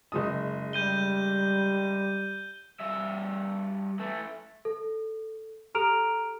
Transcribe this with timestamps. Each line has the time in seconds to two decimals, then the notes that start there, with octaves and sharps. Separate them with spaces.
0.12 F#1 G#3 D#6
0.73 G3 G6 D#7 G7
2.80 G2 E5
4.00 E3 A3
4.65 A4
5.75 G4 A4 A#5 F6 D7 F7